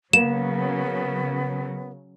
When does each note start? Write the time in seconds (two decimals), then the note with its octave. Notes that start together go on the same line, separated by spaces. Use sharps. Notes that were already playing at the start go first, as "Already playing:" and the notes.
0.13 C#3 F#3 A#3 B3 E7